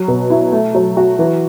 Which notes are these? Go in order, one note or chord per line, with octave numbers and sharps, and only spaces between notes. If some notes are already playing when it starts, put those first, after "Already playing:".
Already playing: F#3
B2
E4
A3
F#3
F#4
E3